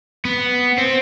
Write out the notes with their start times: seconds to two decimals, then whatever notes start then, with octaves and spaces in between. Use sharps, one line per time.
0.25 B3
0.78 C4